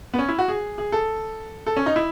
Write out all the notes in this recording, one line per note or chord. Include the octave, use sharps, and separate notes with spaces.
B3
C#4
E4
F#4
G#4
G#4
A4
A4
C#4
D#4
E4